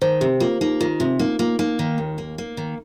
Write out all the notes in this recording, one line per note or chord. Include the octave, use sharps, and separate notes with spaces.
D#3 C5
C3 G4
A#3 F4
A#3 D#4
D#3 F4
C3 F4
A#3 D#4
A#3 F4
A#3 D#4
D#3
D#2
A#3
A#3
D#3